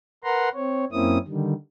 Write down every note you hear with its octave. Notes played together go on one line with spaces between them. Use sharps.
A#4 B4 F#5 A#5 C6
C4 C#5
F#2 A#3 C4 C#4 E4 D#6
D3 D#3 G3